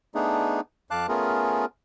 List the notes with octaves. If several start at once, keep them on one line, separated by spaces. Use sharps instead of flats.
A3 B3 D4 D#4 G#4
F2 F5 A5 D6 F#6
A3 B3 C#4 F4 G#4 A#4